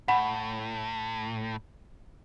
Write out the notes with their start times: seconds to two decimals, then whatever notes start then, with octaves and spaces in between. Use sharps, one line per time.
0.08 A2 F#5 B5